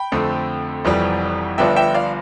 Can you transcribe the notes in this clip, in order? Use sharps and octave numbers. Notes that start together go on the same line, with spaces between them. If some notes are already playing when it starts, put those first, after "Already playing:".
Already playing: G5 B5
F2 D3 A3 C4
F1 F2 E3 G3
G1 G2 F3 B3 D4 E5 G5
E5 G5
D5 F5